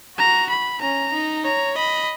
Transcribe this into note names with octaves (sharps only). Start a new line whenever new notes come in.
F#4 A#5
B5
C#4 A#5
D#4
C#5 A#5
D#5 B5